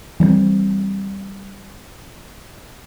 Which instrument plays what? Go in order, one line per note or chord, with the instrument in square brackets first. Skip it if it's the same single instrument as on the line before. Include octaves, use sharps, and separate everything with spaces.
[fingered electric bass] E3 G3 A#3 C4